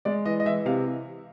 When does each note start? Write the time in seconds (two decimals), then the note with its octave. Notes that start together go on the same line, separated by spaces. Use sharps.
0.05 G#3 D5
0.25 E3 D#5
0.40 D#5
0.46 E3 E5
0.66 C3 F5